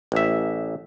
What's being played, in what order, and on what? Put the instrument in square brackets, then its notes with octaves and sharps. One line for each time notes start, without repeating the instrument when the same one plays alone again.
[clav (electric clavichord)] A1 E5